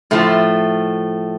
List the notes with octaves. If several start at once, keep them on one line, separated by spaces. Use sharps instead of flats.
A2 F3 A3